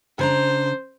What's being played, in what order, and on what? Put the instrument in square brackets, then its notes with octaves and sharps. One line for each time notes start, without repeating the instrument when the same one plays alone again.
[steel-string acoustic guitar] C#3 D4 A#5 [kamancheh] C5